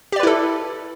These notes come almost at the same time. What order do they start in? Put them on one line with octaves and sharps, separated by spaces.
G4 D5 B4 E4 A4